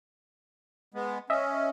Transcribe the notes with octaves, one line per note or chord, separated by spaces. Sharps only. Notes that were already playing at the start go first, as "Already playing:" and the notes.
G#3 B3
C#4 D#5 E5